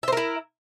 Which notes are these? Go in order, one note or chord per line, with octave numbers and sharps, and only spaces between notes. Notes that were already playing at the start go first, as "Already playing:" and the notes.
E4 A#4 C5 E5